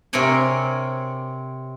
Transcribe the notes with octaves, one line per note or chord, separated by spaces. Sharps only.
C3 C4 A#4 C#5 D5 G#5